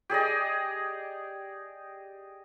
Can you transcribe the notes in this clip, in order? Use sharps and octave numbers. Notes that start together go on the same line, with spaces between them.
G4 G#4 D5 D#5